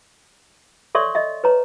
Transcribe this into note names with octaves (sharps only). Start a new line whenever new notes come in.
A4 C#5 D5 E5 C6 C#6
D#5 E5
B4 C#5 A#5